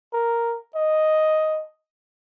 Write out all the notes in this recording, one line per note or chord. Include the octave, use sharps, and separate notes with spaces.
A#4
D#5